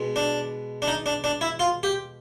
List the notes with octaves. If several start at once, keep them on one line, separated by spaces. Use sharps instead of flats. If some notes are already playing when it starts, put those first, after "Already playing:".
Already playing: B2 G#3
D4
D4
D#4
D4
D4
E4
F4
G4